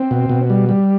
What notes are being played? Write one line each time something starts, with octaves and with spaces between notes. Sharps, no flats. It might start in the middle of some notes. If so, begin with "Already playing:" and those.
Already playing: C4
B2
B2
G3
G3